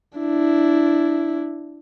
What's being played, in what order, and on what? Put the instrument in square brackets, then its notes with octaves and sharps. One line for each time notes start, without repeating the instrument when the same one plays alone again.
[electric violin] D4 E4